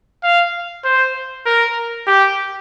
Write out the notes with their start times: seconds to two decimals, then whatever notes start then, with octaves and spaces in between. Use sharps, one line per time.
0.23 F5
0.84 C5
1.46 A#4
2.07 G4